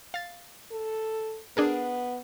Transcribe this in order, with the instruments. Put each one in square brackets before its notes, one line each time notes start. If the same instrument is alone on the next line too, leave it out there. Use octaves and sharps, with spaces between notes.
[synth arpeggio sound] F5 A6
[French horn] A4
[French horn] B3 [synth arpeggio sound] D4 G#4 A#4